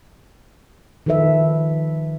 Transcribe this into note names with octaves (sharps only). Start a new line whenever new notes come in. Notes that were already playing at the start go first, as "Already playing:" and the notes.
D#3 F3 A4 B4 E5